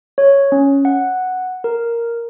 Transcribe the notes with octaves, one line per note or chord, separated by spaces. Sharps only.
C#5
C#4
F#5
A#4